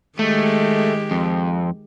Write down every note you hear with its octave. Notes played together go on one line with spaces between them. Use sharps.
D#3 G#3 A3 G4
F2